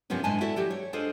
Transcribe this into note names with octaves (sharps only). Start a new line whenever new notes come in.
F#2 C3 F3 F#3 B3 C#4
A2 D3 G#3 D#5 G#5 A5
E4 F#4 A4 D5
E3 F#3 G4 A4
C#5
D4 F4 G#4 A4 C5 D#5